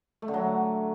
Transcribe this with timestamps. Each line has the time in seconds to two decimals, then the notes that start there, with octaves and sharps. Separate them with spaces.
0.22 A3
0.28 D3
0.34 F#3